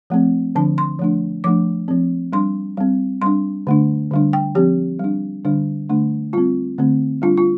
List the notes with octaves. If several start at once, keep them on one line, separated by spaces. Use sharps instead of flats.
F3 A3 C4
D3 F3 D4 A5
C6
F3 A3 D4
F3 A3 D4 D6
F3 C4
G3 D4 C6
G3 C4
G3 D4 C6
D3 A3 D4
D3 G3 D4
G5
F3 C4 G4
G3 D4
D3 G3 D4
D3 A3 D4
G3 C4 F4
D3 A3 C4
G3 D4 F4
F4